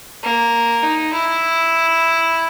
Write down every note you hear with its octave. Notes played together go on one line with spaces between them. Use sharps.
A#3
D#4
E4